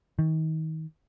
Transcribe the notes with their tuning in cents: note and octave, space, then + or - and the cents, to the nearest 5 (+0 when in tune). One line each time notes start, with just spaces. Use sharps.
D#3 +30